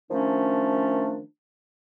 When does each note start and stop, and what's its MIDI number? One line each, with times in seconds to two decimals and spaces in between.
0.10 1.21 51
0.10 1.21 53
0.10 1.21 57
0.10 1.21 61
0.10 1.21 62